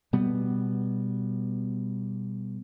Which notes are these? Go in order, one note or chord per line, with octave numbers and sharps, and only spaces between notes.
B2 G3 B3